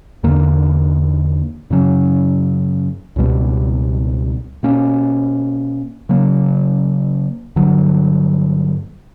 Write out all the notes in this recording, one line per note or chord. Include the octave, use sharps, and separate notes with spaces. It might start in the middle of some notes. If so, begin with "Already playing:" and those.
E2 D3 A#3
F#2 C#3 F#3 C#4
C#2 B2 G3
B2 A#3 C#4
C#3 F#3 A#3
G2 D3 F#3